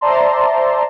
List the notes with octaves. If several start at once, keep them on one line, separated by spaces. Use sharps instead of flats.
C5 D5 E5 A5 A#5 C6